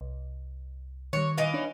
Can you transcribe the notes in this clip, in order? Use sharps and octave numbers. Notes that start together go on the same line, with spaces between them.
C2
D#3 G3 C#5
E3 D#5 F5
D4 D#4 C#5